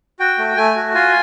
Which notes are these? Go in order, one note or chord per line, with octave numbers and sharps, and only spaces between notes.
F#4 G5
A3
A3 G#5
F#4
F4 G#5